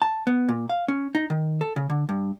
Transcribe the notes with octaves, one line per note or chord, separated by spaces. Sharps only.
A5
B3
A#2
F5
C#4
D#4
D#3
A4
C#3
D3
G2